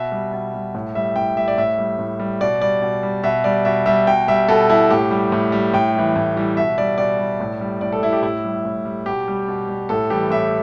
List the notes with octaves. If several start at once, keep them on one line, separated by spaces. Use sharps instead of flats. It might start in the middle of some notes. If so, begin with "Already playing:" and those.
Already playing: B2 E5
G3
B2
G3
A2
G3 E5
A2 G5
G3 E5
D5
A2 E5
G3
A2
G3
B2 D5
G3 D5
B2
G3
B2 E5
G3 D5
B2 E5
G3 E5
B2 G5
G3 E5
B2 A4
G3 E4
A2 G4
G3
A2
G3
A2 G5
E3 G3
A2
E3 G3
B2 E5
G3 D5
B2 D5
G3
A2
G3
A2 D5
A4
G3 E4
G4
A2 E4
G3
A2
G3
B2 G4
G3
B2
G3
A2 A4
E3 G3 G4
A2 E5